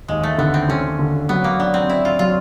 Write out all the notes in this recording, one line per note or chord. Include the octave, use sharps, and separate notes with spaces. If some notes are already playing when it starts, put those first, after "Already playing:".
D#2 G#3
A3
D3 B3
C4
D3 C#4
D3
F#3 B3
A#3
B3 D4
C4
D4 E4
F4
F#3 F4